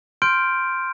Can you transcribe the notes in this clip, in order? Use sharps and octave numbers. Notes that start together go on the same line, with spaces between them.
C6 F6 G6 D7